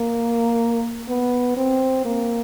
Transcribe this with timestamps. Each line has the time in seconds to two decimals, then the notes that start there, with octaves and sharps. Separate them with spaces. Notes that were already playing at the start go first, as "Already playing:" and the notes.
Already playing: A#3
1.09 B3
1.57 C4
2.05 A#3